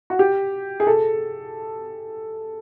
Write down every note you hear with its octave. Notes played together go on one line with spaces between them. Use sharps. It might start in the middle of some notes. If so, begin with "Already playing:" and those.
F#4
G4
G#4
A4